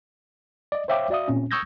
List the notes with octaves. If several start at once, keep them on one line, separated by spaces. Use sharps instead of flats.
D5 D#5
C5 C#5 E5 F5 G5 D6
F#4 D5 E5 F5 D#6
A#2 C4 C#4
C#6 D#6 E6 G6 G#6 A#6